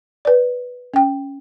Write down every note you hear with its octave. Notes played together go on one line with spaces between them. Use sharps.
B4 D5
C#4 G5